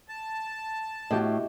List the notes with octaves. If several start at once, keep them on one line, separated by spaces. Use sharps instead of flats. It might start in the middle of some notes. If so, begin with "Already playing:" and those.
A5
A2 F#4 G4 D#5